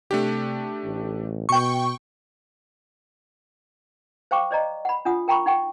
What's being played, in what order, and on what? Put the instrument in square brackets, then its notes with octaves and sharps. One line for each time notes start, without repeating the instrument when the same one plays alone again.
[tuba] C3 [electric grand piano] A3 D4 G4
[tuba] A1
[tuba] B2 [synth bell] G5 C#6
[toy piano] C5 F5 G5 C#6 D6
C5 D5 D#5 A#5
F#5 B5
D4 F4 F#5 D#6
A#4 G5 A#5 B5 C#6
D#4 F#5 G5 C#6